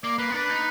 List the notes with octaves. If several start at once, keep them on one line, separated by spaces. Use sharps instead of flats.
A#3 D5
A#3 B4
B3
D4 B4
D#4